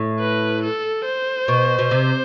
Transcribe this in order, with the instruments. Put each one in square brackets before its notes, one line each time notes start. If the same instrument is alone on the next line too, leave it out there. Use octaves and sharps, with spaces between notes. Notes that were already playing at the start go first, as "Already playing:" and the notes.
Already playing: [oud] A2
[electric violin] B4
A4
C5
[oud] B2
B2
C3